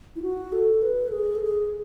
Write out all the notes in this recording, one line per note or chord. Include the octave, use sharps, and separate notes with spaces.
E4
F#4
A4
B4
A4
G#4
A4
G#4